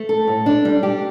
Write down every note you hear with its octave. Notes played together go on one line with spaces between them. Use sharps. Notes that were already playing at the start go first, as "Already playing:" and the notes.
Already playing: A3
A4
A2
D4
G3
G4